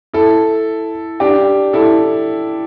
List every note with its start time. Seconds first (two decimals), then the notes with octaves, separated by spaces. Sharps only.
0.13 E4 A4
1.20 D4 G4
1.73 E4 A4